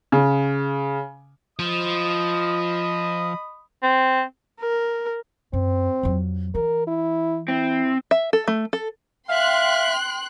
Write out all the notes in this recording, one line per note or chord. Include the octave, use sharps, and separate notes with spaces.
C#3
F3 D#5 B5 D#6
C4
A#4
F#2 C4
F2 F#3
E3 A#4
E4
C4 E4
E5
A4
A3
A4
E5 F5 G5 C6 F#6